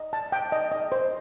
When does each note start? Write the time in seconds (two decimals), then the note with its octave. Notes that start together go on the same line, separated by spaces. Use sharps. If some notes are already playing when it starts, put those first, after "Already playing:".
Already playing: D#5
0.13 A5
0.32 G5
0.52 D#5
0.72 D#5
0.92 C5